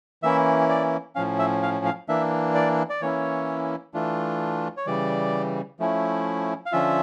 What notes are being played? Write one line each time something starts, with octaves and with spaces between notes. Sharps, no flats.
E3 A#3 C#4 E4 E5
D5
A2 F3 C#4 F5
E5
F5
F5
E3 A#3 D4 E5
D5
D5
E3 A#3 C#4 E4 C#5
E3 A3 D4 F4
C#5
C#3 E3 G3 D5
F3 A3 C#4 E4
F5
D3 F3 C#4 F4 E5